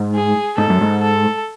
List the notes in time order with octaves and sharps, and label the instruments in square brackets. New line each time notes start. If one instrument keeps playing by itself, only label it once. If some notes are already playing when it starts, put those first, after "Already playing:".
Already playing: [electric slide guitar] G#2
[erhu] G#4
[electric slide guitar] G#2 [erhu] A4
[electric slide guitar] F#2
G#2
[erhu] A4